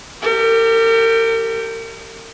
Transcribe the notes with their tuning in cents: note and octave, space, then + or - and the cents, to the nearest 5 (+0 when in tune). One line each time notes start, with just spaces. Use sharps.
G4 +0 A#4 -40